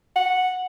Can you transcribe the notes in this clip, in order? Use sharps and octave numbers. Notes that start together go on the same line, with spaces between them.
F#5